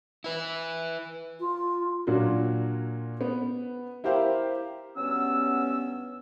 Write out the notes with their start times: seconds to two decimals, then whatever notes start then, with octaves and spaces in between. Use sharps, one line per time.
0.24 E4 B4
1.40 F4
2.07 A#2 F#3 D4 F4 F#4
3.21 B3
4.04 E4 G4 A#4 C5 F5
4.96 G2 F#3 B3 C#4 E6